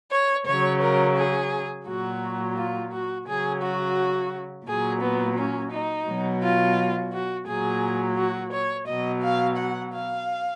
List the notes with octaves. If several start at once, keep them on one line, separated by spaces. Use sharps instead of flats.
C#5
C#3 F#3 C#5
A#4
G#4
A#2 F#3 F#4
F4
F#4
C#3 F#3 G#4
F#4
A#2 F#3 G#4
B3
C#4
D#4
B2 F#3
F4
F#4
A#2 F#3 G#4
F#4
C#5
B2 F#3 D#5
F5
F#5
F5